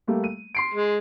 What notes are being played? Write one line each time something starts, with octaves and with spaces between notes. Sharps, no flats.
G3 A3 A#3
D#7
C6 C7 D7
G#3